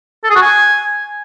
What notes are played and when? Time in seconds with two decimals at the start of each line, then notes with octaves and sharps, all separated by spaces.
0.24 A4
0.30 G#4
0.36 F#4
0.42 G#5